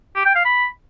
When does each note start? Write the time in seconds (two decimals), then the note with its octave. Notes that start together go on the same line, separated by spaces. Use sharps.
0.15 G4
0.25 G5
0.35 F5
0.45 B5